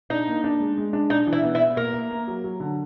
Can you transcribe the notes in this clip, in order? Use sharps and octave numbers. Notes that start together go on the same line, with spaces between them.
D4 D#4
A#3
D4
G#3
G#3
D4
D4 D#4
E3
E4
B3
E4
B3
A#3 A#4
A#3
A#3
F#3
F#3
D3